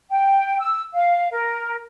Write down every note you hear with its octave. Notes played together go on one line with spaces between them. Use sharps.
G5
E6
F5
A#4